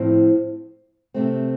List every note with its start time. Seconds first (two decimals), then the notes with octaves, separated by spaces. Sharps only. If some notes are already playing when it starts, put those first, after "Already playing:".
Already playing: A2 F3 C4
1.14 C3 A3 C4